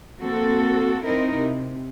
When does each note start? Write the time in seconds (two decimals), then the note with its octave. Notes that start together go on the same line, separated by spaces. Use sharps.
0.21 A#3 C4 F#4 A4
1.05 C4 D#4 E4 A#4
1.36 C3